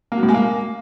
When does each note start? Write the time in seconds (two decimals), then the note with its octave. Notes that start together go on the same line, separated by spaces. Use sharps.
0.12 A#3
0.17 F#3
0.23 A2
0.29 G#3
0.34 A#3